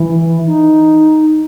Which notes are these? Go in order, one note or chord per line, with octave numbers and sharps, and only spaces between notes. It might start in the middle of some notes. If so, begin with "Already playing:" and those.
Already playing: E3
D#4